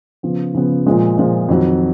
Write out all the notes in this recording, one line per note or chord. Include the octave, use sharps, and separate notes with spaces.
C#3 F3 B3
C#3 F3 B3
A#2 F3 G#3
A#2 F3 G#3
F2 D#3 F#3